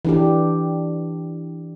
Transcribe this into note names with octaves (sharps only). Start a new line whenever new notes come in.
E3 D4 G4